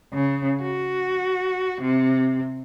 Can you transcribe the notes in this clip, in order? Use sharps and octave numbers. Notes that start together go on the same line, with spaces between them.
C#3
F#4
C3